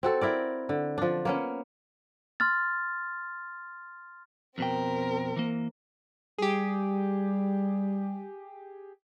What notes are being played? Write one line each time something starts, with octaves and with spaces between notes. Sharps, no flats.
C4 F#4 A4
E4 A#4 D5
D3
F3 D4
A#3 B3 C#4
C6 F6 A6
F2 B2 C4 A#4 G5
E3 A#3
G3 G4 G#4